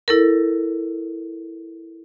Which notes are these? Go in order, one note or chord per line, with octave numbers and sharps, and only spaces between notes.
E4 A4 A#4